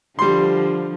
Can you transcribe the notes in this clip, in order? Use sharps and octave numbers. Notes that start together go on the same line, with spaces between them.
D3 F3 G3 C6